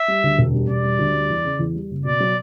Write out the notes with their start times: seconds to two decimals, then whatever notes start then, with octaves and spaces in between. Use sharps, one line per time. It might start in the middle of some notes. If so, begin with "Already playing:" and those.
Already playing: E5
0.08 G3
0.23 D2
0.38 E1
0.54 G3
0.69 E1 D5
0.84 G3
0.99 D2
1.14 G3
1.30 E2
1.44 C#3
1.59 E2
1.75 G3
1.90 F#1
2.05 B2 D5
2.20 F#3